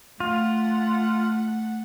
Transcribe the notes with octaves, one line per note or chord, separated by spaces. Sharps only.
A3 F4 F#5